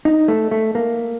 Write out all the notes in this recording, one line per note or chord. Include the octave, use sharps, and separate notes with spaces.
D#4
A3
A3
A#3